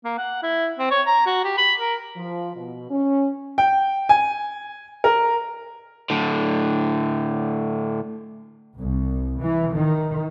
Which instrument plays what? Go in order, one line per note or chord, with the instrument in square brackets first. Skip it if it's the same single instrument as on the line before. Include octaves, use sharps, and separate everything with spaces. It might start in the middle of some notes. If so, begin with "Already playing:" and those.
[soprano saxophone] A#3
F#5
E4
C4
C#5
A#5
F#4
G4
B5
A#4
[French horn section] F3
B2
C#4
[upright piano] G5
G#5
A#4
[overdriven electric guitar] A2 D3
[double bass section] C2
E3
D#3